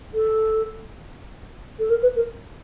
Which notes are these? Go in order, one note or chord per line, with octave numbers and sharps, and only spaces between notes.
A4
A4
A#4
B4
A#4